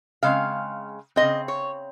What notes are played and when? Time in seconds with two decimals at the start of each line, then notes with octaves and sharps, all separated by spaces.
0.23 C#3 G#3 C4 F5
1.16 G#3 C4 D#5
1.22 C#3
1.48 C#5